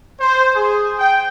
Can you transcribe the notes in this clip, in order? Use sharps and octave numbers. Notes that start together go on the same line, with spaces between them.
C5
G#4
G5